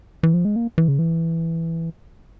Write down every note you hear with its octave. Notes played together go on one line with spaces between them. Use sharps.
E3
F3
G#3
A#3
E3
C#3
E3